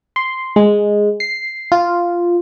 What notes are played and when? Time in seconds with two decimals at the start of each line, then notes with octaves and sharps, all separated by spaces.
0.16 C6
0.56 G#3
1.20 C7
1.72 F4